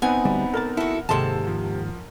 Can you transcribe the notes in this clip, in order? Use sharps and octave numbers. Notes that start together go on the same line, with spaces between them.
B3 C4 D#4 F#5 G#5 B5
D2 G3 B5
A4 A#4 D5 A5
E4 F#4 A4
D#2 G#2 C3 G#3 A4 A5 C6
F3